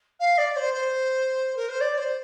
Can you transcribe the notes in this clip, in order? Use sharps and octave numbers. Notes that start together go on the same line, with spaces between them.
F5
D5
C5
C5
A#4
C5
D5
C5